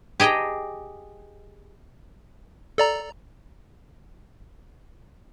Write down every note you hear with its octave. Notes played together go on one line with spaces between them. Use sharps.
G4 G#4 D#5 G5 A#5
A4 D5 A#5